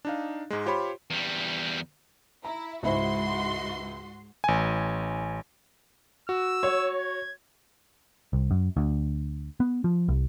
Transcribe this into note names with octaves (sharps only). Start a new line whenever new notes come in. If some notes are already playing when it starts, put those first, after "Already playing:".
D4 D#4 F5
G#2 G#3
F4 G4 C5 C#5 B5 C6
E2 G3
E4 A#5
C#2 G#2 E4 F#4 C5 C6
A1 G#5
F#4 E6
C#5
G#6
C2
F#2
D2
B3
F3
C2